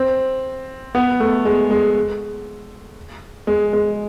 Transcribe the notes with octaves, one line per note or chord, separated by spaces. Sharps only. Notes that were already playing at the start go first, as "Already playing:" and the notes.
Already playing: C4
B3
A3
G#3
G#3
G#3
G#3